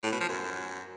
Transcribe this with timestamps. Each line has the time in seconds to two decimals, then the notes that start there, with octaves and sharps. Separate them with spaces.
0.04 A2
0.12 B2
0.21 F3
0.29 F#2